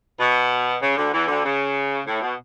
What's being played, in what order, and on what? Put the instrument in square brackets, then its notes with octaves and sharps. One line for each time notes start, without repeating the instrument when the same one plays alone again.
[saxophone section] B2
C#3
D2 D3
E2 E3
D2 D3
C#3
A2
B2